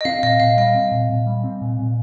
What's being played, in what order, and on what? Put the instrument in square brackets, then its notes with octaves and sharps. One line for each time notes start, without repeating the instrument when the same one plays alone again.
[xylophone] D#5
[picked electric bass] C4 [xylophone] F5
[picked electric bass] A#2 [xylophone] D#5
[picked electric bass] A#2 [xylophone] F5
[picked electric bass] G3 [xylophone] D#5
[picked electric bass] C4
A#2
A#2
G3
C4
A#2
A#2